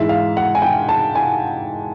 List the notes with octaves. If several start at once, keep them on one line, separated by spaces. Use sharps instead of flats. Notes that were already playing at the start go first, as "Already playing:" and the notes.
Already playing: G#2 E3 G#3 E5
F5
F#5
G#5
G5
A5
G#5